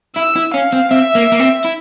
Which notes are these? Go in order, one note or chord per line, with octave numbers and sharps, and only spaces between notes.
E4 E6
E4
C#4 F5
C4
C4 E5
A#3
A#3
C4
E4